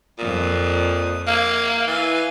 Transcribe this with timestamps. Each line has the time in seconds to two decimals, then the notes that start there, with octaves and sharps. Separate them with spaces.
0.19 F2 A#2 D#6
1.28 A#3 G#6
1.87 E3 F5 G#5